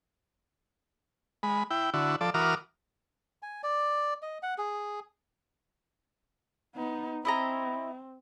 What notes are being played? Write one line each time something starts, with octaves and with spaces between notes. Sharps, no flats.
G#3 B5
E4 G5
D3 E4 F#4
F3 A4 D5
E3 F#4 A#4 D6 D#6 F6
G#5
D5
D#5
F#5
G#4
B3 D#4
C4 E4 D#5 A#5